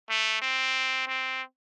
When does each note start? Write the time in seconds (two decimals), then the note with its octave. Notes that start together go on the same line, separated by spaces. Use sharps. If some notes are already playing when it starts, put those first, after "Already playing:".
0.10 A3
0.42 C4
1.08 C4